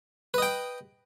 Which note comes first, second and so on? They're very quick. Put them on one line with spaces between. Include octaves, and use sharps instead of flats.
B4 D#5 G5